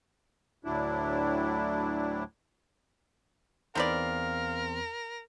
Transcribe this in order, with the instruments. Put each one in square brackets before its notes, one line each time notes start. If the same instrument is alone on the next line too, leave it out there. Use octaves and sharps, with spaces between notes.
[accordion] D2 A2 F#3 D4 E4
[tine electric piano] E2 C4 C6 [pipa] D#4 B4 D5 [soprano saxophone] A#4 [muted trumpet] F5